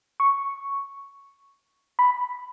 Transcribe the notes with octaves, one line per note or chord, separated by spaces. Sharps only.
C#6
B5